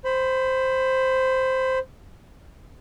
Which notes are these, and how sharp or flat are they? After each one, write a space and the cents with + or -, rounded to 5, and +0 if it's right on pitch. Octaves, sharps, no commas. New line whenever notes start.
C5 +0 B5 +20